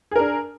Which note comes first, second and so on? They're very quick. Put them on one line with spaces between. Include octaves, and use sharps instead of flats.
G#4 A#4 D4